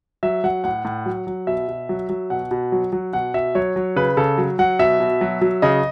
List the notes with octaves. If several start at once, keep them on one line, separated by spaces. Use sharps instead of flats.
F#3 E5
F#3 F#5
A2 F#5
A2
F#3
F#3
B2 E5
B2
F#3
F#3
B2 F#5
B2
F#3
F#3
B2 F#5
B2 E5
F#3 C#5
F#3
C#3 B4
C#3 A4
F#3
F#3 F#5
B2 E5
B2
F#3
F#3
C#3 D#5